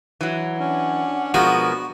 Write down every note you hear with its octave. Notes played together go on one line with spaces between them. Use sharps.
E3 F#3
C#4 D4 F#5
B2 F3 G#3 B3 F#4 A#4